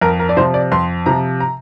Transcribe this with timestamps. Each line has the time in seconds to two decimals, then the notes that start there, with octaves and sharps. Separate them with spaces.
0.01 F2 A#4
0.19 A#4
0.29 D5
0.37 C3 C5
0.40 F3
0.54 D5
0.72 F2 C6
1.06 C3 F3 A#5
1.40 A#5